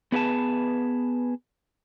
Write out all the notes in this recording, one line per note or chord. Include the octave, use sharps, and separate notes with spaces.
B3 G#4 B4 D#5 A5